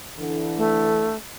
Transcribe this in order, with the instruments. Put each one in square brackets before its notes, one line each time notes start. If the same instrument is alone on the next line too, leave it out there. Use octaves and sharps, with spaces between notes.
[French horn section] D3 E3
[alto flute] A3